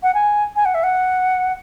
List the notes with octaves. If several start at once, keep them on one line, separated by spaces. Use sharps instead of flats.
F#5
G#5
G#5
F#5
E5
F#5